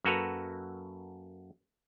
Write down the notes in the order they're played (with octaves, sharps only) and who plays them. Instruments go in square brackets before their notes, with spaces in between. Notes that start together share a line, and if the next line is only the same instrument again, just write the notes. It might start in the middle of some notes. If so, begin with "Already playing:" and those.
[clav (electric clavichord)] F#2 A#3 F#4 A4 B4 A#5